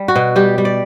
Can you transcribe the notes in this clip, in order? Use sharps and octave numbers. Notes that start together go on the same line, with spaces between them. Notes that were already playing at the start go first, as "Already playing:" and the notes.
Already playing: G3
F#4
B2
G3 G4
G3
D5